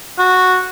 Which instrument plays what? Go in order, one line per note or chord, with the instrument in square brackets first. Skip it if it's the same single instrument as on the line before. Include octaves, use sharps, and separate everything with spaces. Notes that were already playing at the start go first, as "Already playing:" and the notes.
[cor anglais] F#4